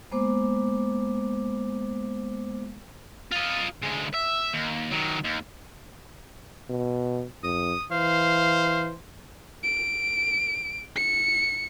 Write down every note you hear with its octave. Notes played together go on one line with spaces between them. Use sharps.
G#3 A#3 B3 C5 D6
F4 D#5
D2 G#3
E5
D#2
D#3 F#3
D#2
B2
F2 D#6
E3 C5 F5
D7
C#7